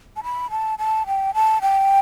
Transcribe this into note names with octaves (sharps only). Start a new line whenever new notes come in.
A5
B5
A5
A5
G5
A5
G5